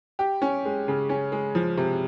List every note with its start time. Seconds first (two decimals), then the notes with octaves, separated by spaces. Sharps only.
0.19 G4
0.42 C#4
0.65 G#3
0.88 C#3
1.09 C#4
1.32 G#3
1.55 F3
1.77 C3